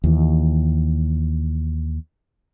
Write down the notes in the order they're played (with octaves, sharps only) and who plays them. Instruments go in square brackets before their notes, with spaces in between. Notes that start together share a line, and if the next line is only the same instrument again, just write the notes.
[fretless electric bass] D#2 E3